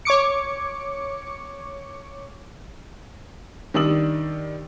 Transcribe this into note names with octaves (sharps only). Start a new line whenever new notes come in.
C#5 C#6 D6 C#7
D#3 G3 D4 D#6 E6 F#7